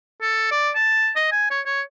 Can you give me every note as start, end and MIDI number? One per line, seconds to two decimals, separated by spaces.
0.21 0.47 69
0.51 0.70 74
0.75 1.11 81
1.16 1.28 75
1.32 1.48 80
1.51 1.60 73
1.66 1.81 73